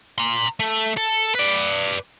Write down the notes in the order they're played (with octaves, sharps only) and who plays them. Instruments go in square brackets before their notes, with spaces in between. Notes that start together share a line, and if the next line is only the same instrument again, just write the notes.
[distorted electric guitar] A#5 C6
A3
A4
B4 D5